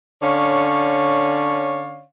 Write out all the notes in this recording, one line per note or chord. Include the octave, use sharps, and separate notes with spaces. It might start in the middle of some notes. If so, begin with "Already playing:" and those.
D3 C#4 C#5 D5 F5